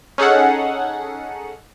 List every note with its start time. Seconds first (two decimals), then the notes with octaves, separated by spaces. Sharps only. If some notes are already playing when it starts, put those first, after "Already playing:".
0.18 C#4 D#4 G#4 A4 F#5